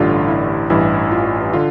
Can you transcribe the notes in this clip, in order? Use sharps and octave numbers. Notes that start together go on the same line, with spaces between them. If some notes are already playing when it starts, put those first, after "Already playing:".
Already playing: A1 G2 D3 F4
E4
A1 G2 E3 E4
F4
D3 F4